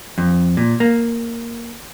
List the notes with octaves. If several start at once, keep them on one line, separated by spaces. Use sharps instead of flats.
F2
A#2
A#3